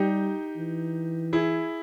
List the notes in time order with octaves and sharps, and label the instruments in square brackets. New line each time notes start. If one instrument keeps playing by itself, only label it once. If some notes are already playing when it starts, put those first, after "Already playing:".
Already playing: [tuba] G3 [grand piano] D#4 G4
[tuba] E3
[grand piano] E4 G#4